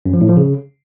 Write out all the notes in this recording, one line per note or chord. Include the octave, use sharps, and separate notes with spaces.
F#2
F3
A2
F3
C#3